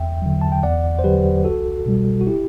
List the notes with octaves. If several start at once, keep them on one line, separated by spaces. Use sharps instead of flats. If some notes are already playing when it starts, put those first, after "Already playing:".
Already playing: E2 E5 G5
D3 F#3
A5
G5
E2 D5 F#5
C5
D3 F#3 G4 B4
C2 F#4 A4
B2 G3
F#4
E4 G4